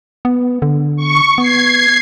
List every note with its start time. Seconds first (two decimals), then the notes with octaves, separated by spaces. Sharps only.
0.25 B3
0.62 D3
0.97 C#6
1.38 B3 G#6 C7